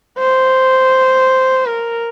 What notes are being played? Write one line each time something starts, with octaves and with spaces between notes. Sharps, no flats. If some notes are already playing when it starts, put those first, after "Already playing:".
C5
A#4